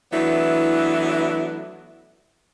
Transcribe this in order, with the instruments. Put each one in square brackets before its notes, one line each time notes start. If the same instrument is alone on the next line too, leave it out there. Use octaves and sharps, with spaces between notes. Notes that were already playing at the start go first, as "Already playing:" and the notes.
[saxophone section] E3 F#3 A3 B3 D4 E4